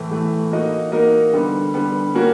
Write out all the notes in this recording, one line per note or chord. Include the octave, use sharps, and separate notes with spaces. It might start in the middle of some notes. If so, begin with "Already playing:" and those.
Already playing: A2 E3 A3
A2 E3 A3
A#3 D#4 F#4 A#4 D#5
A#3 D#4 F#4 A#4 D#5
D3 G3 B3
D3 G3 B3
A#3 C#4 F#4 A#4